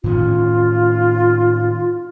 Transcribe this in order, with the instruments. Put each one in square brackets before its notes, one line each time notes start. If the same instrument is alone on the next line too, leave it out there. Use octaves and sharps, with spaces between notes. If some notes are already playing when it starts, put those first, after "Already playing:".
[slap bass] A2 D#3 C#4 [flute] F4